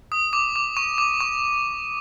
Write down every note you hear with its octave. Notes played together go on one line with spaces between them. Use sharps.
D#6
D6
D6
C#6
D6
C#6